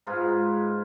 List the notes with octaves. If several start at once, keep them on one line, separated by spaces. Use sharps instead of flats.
G#2 D#4 F4 B4